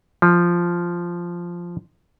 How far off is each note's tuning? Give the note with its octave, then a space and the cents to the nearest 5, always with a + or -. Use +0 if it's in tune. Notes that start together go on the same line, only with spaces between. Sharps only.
F3 -5